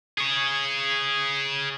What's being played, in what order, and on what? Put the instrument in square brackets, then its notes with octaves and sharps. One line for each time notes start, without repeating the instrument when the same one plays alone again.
[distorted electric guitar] G#4 C#5